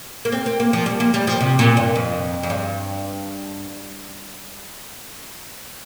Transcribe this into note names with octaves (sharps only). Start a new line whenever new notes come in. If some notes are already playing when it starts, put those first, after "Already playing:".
A#3
C4
C4
A#3
F3
G3
A#3
G3
F3
C3
A#2
G2
F2
F2
G2